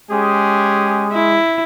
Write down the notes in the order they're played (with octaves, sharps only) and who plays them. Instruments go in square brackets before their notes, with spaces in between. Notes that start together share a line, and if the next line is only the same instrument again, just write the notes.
[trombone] G#3 [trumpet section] C#4 G4 G#4
[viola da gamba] E4